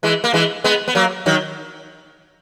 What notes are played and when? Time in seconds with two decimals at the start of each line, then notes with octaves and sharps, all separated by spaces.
0.03 E3 G#3
0.24 A#3
0.34 E3 G#3
0.64 G#3 B3
0.88 B3
0.95 F#3 A#3
1.26 D#3 F#3